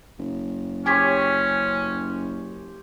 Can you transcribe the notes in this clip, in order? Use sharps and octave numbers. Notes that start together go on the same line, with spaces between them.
F#1
C#4 G4 C5 C#5 G#5 G#6 B6